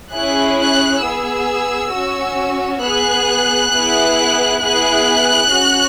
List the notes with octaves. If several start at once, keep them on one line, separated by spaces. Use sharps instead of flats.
C#4 E4 G#4 F#6
F#6
B3 G#4 E6
C#4 F#4
B3 G#4 F#6
B3 E4 G#4
B3 E4 G#4 F#6
C#4 F#4